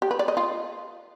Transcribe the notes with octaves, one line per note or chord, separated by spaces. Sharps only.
G4
B4
D5
D#5
F4